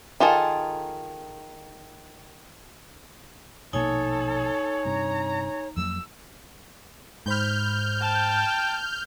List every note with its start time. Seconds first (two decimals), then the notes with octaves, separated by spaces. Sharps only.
0.20 D#3 F4 G#4 A4
3.73 A#1 B2 A#3 D#4 A4 C#5 G#5
4.85 G2 C3 A#5
5.77 F2 F#3 A#3 E6
7.26 G#2 C5 B5 F6 G6
8.01 G5 A5